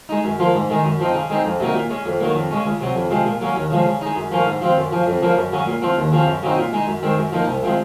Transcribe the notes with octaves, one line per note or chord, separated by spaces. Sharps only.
G#3 D#4
F#2
F3 A#3 F4
G#2
D#3 G#3 D#4
F#2
F3 C4 D#4
C#3
G#3 C4 D#4
F2
C3 F#3 A#3 D#4
A#2
G#3 C#4
F2
D#3 F#3 A#3
F2
C#3 G#3 C#4
C#2
C3 F#3
F2
C3 F3 G#3
A#2
F#3 A#3 C#4
D#2
C#3 F3 G#3
C#3
G#3 D#4
F#2
F3 A#3 C#4 F4
G#2
F3 C4 F4
F#2
C#3 F3
F2
C#3 F3 A#3
F#2
C#3 F#3 C#4
A#2
F3 C4 F4
D#2
C#3 F3 C4 F4
F#2
C#3 F#3 C4 D#4
A#2
G#3 D#4
F#2
D#3 G#3 C4
F#2
F3 A#3 D#4
C2
C3 F3 G#3